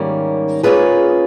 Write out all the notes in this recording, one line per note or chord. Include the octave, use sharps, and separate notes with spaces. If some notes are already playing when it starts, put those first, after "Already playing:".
Already playing: G#2 D#3 G3 A#3 C#4
A#3 C#4 F4 G#4 B4